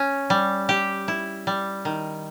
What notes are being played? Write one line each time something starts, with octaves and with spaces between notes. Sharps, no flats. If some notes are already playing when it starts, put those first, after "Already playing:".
Already playing: C#4
G3
G4
E4
G3
D#3